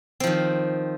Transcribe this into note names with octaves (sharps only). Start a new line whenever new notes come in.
D#3 F3 C4